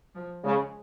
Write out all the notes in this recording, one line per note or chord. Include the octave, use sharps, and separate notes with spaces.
F3
C#3 G#3